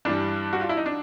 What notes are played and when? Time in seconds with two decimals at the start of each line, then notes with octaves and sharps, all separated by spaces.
0.05 G2 E3 G3 D4
0.53 F#4
0.61 F4
0.69 E4
0.77 D#4
0.86 D4